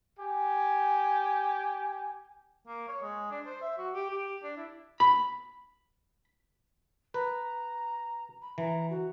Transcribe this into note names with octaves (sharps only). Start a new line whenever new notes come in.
G4 G#5
A#3
C#5
G#3
D4
C5
E5
F#4
G4
G4
D4
E4
B5
B4 A#5
B5
E3 A#5
F#4